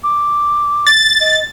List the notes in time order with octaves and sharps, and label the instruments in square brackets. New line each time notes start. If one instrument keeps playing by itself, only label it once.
[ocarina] D6
[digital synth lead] A6
[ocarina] D#5